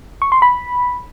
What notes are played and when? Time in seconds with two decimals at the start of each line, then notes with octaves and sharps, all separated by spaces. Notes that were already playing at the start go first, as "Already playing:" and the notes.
0.22 C#6
0.32 C6
0.42 B5